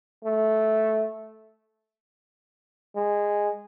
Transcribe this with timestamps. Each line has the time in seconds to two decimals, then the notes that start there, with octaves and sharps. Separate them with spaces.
0.25 A3
2.96 G#3